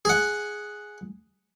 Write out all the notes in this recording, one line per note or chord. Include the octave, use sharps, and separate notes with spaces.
G#4 F#5